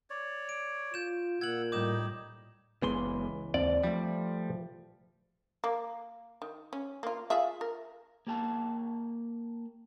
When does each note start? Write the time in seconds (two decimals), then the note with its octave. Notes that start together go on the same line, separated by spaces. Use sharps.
0.10 C#5 D5
0.49 D7
0.94 F4 G6 E7
1.41 A#2 F#5 E6 G#6 F#7
1.72 A2 G3 D#4 D#5 D6 G6 E7
2.82 F#1 C#2 E3 G#3 B3 C6
3.54 D#2 C4 D5
3.84 F3 G3 A3
5.64 A#3
6.42 D#3
6.73 C#4
7.03 A#3 F4
7.30 F4 G#4 E5
7.61 A#4
8.27 A#3 G4 A5